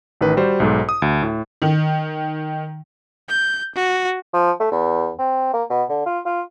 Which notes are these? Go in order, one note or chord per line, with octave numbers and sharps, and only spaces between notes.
A1 D#3 B4
G3 F#4 C5
B1 G#2 A4
D#6
D2
A2
D#3
G6
F#4
F3
A3
E2
C4
A#3
B2
D3
F4
F4